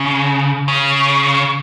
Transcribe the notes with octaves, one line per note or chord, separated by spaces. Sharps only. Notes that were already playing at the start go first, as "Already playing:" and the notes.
Already playing: C#3
C#3